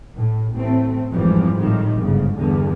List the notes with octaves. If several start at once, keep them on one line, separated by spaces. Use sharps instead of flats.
A2
A1 A3 C4
G#1 F2 E3 F3 G3
A2 D#3 G3
G1 G#2 C#3
E2 G2 D3